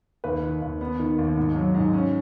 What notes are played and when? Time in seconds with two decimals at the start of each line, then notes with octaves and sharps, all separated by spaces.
0.24 D#2 B4
0.43 D#3
0.62 D#2
0.81 B3
0.99 D#3
1.18 D#2
1.37 G#2
1.56 F#3
1.74 G#2
1.94 C#4